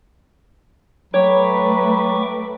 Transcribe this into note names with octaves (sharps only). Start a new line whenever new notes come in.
F#3 A3 B4 C#5 G5 C#6 D6